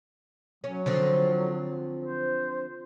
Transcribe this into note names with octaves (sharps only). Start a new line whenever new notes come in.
F#3 C#4
D3 F3 C4
C5